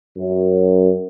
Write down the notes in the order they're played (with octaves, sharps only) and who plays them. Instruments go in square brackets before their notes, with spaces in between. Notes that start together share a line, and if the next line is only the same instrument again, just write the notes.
[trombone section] F#2